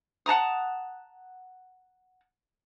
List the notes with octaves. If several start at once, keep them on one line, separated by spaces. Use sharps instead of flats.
F#5 A5 A#5 D#6